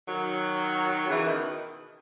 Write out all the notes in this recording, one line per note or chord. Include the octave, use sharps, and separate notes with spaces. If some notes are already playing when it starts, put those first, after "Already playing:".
D#3 F#3
C#3 E3
B2 D#3